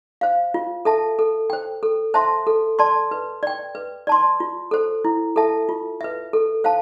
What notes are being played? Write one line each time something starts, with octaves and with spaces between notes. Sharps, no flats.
C5 F5
F4
A4 E5 A5
A4
C5 G5
A4
C5 E5 A5 C6
A4
D5 A5 C6
B4
D5 G5
B4
D5 A5 C6
F4
A4 C5
E4
A4 E5 A5
F4
B4 E5
A4
C5 F5 A5